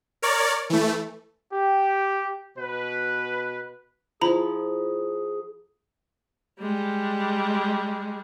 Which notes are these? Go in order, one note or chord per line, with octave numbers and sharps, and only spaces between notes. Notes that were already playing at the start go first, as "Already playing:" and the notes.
A#4 C#5 D5
E3 A3
G4
B2 B4
F3 E4 G#4 A#5 B5
G3 G#3